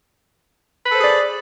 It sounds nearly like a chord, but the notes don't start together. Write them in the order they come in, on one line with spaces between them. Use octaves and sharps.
B4 A4 C5 G#4 D5